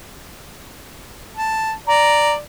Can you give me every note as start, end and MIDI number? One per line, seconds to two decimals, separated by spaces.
1.37 1.72 81
1.87 2.38 74
1.87 2.34 82